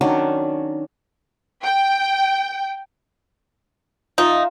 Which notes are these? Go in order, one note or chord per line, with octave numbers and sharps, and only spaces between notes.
D#3 F#3 C#4 D4
G5
D#4 F4 E5 A5